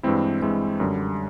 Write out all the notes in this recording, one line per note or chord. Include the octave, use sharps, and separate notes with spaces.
G2 E3 G#3 C4 E4
G2 E3 G#3 C4 E4
F#2 D3 G3